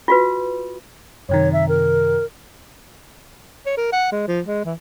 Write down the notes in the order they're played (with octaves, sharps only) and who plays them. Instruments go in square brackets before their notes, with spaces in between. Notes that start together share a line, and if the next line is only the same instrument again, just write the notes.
[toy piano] F4 F#4 B4
[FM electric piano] F#2 C3 D#3 [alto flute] C#5
[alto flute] E5
A#4
[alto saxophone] C#5
A#4
F#5
G#3
F3
G#3
E3